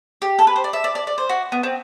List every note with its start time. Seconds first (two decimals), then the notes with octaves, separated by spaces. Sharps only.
0.22 G4
0.39 A4
0.47 B4
0.56 C5
0.64 D5
0.73 E5
0.84 D5
0.95 D5
1.07 D5
1.18 C5
1.29 F#4
1.52 B3
1.63 C4